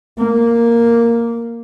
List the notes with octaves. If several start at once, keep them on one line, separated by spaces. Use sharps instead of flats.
A#3